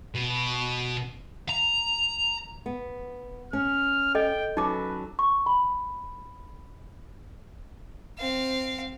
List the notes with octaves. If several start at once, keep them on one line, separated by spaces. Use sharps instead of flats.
B2
A#5
B3
C#4 F6
A4 D#5 G5
F#3 C#4 D#4 A4 B4 D6
C#6
B5
C4 F5